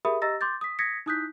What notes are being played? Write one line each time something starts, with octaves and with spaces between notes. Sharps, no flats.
G4 G#4 A#4 E5 B5 D#6
G4 D#5 A#5 E6 A6 A#6
C6 D6 G6 A6
D#6 B6
D#6 G#6 A#6 B6 C#7
D#4 E4 D#6 F#6 G6 B6